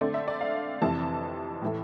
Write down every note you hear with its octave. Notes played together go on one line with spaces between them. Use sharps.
D3 A3 C4 D5
E5
D5
F5
F2 C3 E3 A5
A2 E3 A3